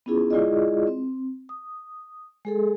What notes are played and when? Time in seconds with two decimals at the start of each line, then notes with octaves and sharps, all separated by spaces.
0.06 B3 C#4 D4 E4 F4 G#4
0.30 G#3 E4 F4 G#4 D5 D#5
0.87 C4
1.49 D#6
2.45 G#3 G#4 A4